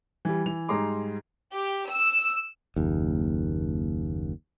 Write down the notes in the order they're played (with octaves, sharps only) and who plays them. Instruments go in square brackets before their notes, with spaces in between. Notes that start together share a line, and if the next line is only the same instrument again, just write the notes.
[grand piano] E3 G3
E3 F7
G#2 G3 G#4 A#5 C6 D6
[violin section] G4
E6
[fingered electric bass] F#1 D#2